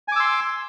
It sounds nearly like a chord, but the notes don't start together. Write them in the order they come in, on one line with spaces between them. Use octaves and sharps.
G#5 D6 E6 C6